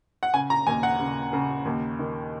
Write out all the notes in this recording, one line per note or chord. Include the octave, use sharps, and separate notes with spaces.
F#5
C#3 G#5
A#5
D#2 G#5
F#5
C#3
C#3
D#2
D#3